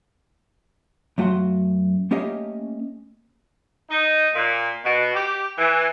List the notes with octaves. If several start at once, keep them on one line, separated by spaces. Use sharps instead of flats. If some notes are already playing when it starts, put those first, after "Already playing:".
F#2 A3 F#4 F5 F#5 C6
A3 A#3 C#4 G4 D#5 F5
D#4
A#2
B2
G4
E3